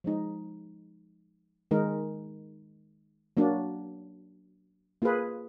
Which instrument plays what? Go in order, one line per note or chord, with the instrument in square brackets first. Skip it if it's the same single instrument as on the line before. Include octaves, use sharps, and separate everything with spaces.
[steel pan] F3 G#3 D#4
D#3 G#3 D#4 A#4
F#3 A#3 D4
A#3 F4 G#4 B4